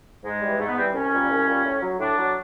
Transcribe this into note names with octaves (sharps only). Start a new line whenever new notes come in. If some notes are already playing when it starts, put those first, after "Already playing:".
G#2 G#3
E3 G3
G#2 A3
B3
E3 G3 C4
C2 C#4
A#2 G3
C2
A#2 G3
A2
F#3
A2 D4
F#3